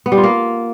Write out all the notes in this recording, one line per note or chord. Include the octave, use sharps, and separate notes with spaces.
B3
G3
F4
A#3